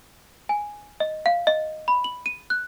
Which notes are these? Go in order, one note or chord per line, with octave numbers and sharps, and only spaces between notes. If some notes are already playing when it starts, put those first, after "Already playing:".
G#5
D#5
F5
D#5
B5
F#7
D#7
F#6